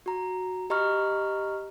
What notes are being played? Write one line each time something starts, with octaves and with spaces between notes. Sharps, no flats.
F#4 A#5
G4 D#5 A#5 B5 C#6 F6